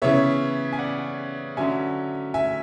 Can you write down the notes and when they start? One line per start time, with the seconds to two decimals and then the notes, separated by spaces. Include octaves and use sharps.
0.02 C#3 E3 B3 C#5 E5
0.73 G#5
0.79 D5 F#5
1.57 D3 F#3 C#4 E5 G#5
2.34 E5 G#5